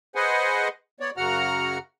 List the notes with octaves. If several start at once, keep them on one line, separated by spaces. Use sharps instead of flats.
G#4 B4 C5 D#5 F#5 G#5
B3 C#5 D5
F#2 C#3 F#4 F#5 A#5 F6